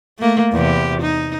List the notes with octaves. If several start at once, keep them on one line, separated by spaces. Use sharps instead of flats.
A3 A#3
E2 C3 G4
D#4